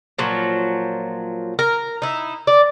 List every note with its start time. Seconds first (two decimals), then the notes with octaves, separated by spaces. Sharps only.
0.19 A#2 F3 F#3
1.59 A#4
2.02 D#4 E4
2.47 D5